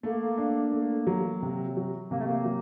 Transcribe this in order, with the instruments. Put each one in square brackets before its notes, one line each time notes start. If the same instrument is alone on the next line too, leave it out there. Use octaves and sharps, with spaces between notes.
[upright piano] A3 [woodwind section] A#3
[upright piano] D4
A3
F#3
C3
F#3
[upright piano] C3 [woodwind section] A#3
[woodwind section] A3
A#3
[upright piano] F#3